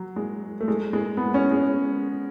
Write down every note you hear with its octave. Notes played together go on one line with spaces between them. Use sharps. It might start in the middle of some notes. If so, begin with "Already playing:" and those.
Already playing: F#3
G#3
A3
G#3
G#3
B3
C#4
G#3